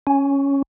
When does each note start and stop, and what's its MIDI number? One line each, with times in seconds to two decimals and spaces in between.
0.07 0.62 61